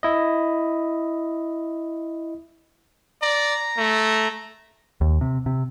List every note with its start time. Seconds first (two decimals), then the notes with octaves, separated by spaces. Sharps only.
0.03 E4 D#5
3.22 D5 A#5
3.77 A3
5.01 D#2
5.21 C3
5.46 C3